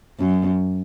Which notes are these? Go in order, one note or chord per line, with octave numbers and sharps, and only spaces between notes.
F#2